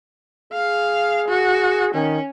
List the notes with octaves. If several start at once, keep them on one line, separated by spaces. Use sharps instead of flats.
G#4 F5
F#4
D#3 C#4